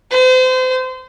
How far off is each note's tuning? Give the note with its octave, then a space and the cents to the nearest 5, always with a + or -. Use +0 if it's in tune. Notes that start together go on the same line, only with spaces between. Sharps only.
C5 -35